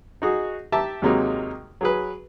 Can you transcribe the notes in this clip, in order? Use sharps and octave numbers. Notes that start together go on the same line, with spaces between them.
D#4 F#4 G#4
G4 E5 A5 A#5
D#2 C3 F#3 G#3 A#3 D#4
F#3 G#4 B4